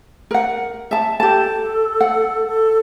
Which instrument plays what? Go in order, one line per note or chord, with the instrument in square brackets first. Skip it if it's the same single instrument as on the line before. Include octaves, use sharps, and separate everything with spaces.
[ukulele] A#4 F#5
E5 A5
[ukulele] G4 A5 [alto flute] A4
[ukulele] F#5
[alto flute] A4